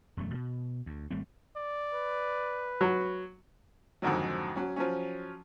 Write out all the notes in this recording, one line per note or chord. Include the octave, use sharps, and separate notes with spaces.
E1 F#2 F3 A3
B2
D2
G#1 G3 A3 C4
D5
B4
F#3
F2 G#2 D3 D#3 F#3
F#3 C#4
F3 F#3 C#4